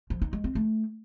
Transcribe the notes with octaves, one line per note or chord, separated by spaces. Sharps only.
F3
D#4
G#3
C4
A3